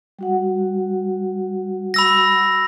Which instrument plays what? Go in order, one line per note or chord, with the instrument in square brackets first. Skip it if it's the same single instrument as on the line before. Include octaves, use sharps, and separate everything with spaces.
[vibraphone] G3 F#4 F#5
[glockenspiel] B5 E6 A#6